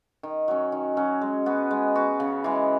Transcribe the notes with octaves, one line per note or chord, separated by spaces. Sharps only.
D#3
F#3 C#4
D#3
F#3 C#4
G#3
B3 F#4
G#3
B3 F#4
C#3
E3 G#3